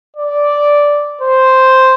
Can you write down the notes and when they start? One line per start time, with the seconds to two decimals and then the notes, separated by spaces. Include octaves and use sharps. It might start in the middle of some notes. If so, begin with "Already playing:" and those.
0.17 D5
1.22 C5